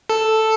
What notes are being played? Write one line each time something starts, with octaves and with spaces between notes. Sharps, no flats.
A4